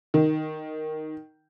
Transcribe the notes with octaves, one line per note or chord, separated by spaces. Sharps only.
D#3